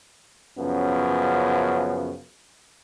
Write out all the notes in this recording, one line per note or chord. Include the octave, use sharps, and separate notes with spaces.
F#2 C#3 F3 B3